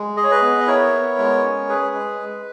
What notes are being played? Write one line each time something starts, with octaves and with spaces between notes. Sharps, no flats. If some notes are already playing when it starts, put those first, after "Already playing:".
Already playing: G#3
G#4 D#5
C#5
B4 D#5
B3
D#5
E4 A#4 C#5
B3
G#3
C#4
G#4 B4
G#3
G#3